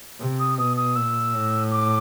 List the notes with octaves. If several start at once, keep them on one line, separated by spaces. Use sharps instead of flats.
C3
D#6
B2 D#6
D#6
A#2 E6
A2
D6